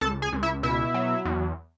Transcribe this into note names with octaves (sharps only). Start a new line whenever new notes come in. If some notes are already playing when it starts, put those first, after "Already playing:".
C#2 A4 A5
G#4 G#5
C#2
E4 E5
B2 E4 E5
F#3
E2